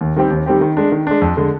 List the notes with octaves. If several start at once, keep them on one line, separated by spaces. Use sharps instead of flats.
D#2
D#3 G3 C4 G4
D#2
D#3 G3 C4 G4
D#3
G#3 D4
D#3
G#3 D4
F2
D3 G#3